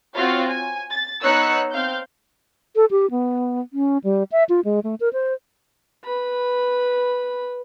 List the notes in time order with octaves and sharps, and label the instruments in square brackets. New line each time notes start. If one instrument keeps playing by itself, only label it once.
[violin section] C4 F4 F#4 C#5 F5
G#5
A6
B3 D#4 C#5 E6 F#6 C#7
C4 F5 G6
[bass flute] A4
G4
B3
C#4
G3
E5
F4
G#3
A3
A#4
C5
[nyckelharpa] B4 B5